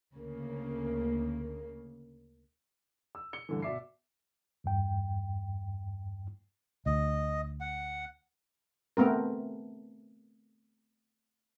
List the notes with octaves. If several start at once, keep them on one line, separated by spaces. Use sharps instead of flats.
D2 C#3 A#3
E6
C#7 G7
G2 D3 E3
B2 D5 E5 D6 C7
E2 G2 G5
D2 D#5
F#5
A3 B3 C4 A#4